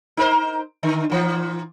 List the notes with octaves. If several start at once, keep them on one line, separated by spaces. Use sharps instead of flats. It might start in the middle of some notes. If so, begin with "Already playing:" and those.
D#4 A#4 C5
D3
A#2 E3